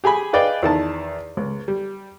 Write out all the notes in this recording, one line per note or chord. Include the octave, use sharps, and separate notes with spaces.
G4 G#4 G#5 B5
G#4 B4 D5 D#5 F5 G5
E2 D#3 A5
C#2
G3